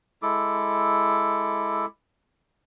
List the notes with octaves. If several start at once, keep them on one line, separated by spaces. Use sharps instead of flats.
G#3 E4 A4 D6